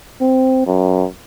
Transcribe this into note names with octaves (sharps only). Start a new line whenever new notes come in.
C4
F#2